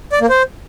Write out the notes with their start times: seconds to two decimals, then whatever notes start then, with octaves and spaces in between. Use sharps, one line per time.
0.12 D5
0.21 A#3
0.29 C5